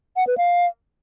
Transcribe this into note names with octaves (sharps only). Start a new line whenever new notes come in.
F#5
B4
F5